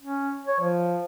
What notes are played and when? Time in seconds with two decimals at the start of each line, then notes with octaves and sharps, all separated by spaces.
0.02 C#4
0.47 C#5
0.60 F3